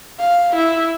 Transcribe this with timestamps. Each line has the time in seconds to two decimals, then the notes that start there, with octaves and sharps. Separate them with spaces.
0.19 F5
0.55 E4